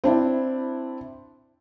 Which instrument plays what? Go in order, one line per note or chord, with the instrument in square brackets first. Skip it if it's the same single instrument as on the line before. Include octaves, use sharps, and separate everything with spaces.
[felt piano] C4 D4 E4